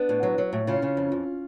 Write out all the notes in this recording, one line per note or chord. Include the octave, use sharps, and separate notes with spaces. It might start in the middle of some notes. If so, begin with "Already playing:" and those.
Already playing: B3 D4
A2
F#3
F#3
A2
C#3 C#4 F4
C#3
F2
F2